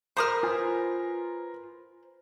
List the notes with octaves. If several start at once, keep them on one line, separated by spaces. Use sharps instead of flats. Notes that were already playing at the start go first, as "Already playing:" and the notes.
A#4 C5 A#5 B5 D#6 F6
F4 B4 G#5